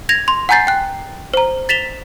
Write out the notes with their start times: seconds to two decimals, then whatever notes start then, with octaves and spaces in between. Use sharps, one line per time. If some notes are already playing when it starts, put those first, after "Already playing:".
0.09 G#6 A#6 F7
0.28 C6
0.49 F#5 G#5 A#5 G6 A6 C7
0.67 G5 F#6
1.34 C5 A#5
1.69 A6 B6 E7 F7 G7